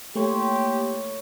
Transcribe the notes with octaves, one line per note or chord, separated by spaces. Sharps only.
A3 A#3 E4 G4 C5 C#5